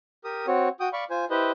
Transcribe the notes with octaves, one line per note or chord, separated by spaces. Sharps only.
G4 A#4 D#6
C4 F#4 C#5
F#4 G5 D#6
D5 F5 B5 C#6
F4 C5 G#5
E4 G4 B4 C5 D#5